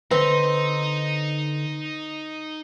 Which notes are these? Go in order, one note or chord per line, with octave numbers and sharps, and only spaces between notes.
D3 C4 D#4 B4